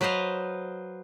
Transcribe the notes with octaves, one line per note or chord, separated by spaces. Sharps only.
F#3 B4 C5 D#5 F5